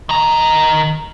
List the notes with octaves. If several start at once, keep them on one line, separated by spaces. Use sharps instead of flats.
D#3 A#5